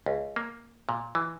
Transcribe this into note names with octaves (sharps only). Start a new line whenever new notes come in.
C#2
A#3
A#2
E3